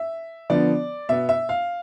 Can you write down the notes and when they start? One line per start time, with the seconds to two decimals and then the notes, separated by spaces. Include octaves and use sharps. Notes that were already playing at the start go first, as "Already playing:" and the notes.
Already playing: E5
0.50 D3 F3 B3 D5
1.09 B2 B3 E5
1.29 E5
1.49 F5